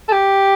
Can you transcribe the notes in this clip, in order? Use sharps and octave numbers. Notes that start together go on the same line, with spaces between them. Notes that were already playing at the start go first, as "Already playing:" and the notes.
A4
G4